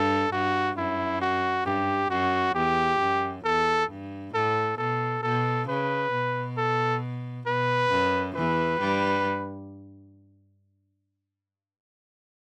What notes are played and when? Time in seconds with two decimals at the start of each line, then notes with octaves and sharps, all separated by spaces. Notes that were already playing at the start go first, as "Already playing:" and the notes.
Already playing: G2 A4
0.32 G2 F#4
0.77 F#2 E4
1.21 F#4
1.65 G2 G4
2.10 F#2 F#4
2.55 E2 G4
3.00 F#2
3.44 E2 A4
3.90 G2
4.34 A2 A4
4.78 B2 A4
5.23 B2 A4
5.68 C#3 B4
6.12 B2
6.57 A4
7.47 B2 B4
7.91 F#2
8.35 E2 E3 B4
8.80 G2 G3